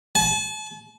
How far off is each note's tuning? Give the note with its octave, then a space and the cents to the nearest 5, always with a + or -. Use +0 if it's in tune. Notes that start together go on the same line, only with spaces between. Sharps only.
A5 -40